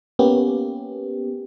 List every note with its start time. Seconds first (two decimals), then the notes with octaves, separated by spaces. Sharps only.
0.19 A#3 B3 C#4 G4